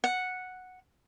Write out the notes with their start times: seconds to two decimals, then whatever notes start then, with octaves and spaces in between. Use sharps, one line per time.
0.04 F#5